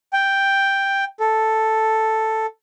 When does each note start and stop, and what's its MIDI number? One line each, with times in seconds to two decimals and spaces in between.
0.13 1.04 79
1.20 2.46 69